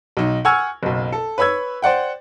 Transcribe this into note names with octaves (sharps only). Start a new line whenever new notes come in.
B1 D#4
F#5 G#5 C#6 E6 F6 G#6
F#1 B1
A4
B4 C#5 B5 E6 G#6
C5 D5 F#5 G5